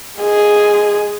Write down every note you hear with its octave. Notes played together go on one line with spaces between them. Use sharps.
G#3 G#4